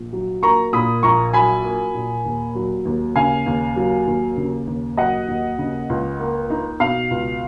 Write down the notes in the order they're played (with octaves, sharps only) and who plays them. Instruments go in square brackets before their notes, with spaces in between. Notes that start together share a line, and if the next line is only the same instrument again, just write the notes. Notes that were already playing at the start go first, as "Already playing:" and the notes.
Already playing: [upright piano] A#1
F#3
A#3 A#5 C#6
A#2 B5 D#6
A#1 A#5 C#6
F#3 G#5 B5
A#3
A#2
D#2
F#3
D#2
C#3 F5 G#5
D#2
F#3
D#2
C#3
D#2
F#3 D#5 F#5
D#2
C#3
C#2
A#3
D#4
B2 F5
C#2